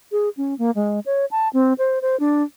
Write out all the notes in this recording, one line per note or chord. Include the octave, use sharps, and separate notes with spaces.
G#4
C#4
A#3
G#3
C#5
A5
C4
C5
C5
D4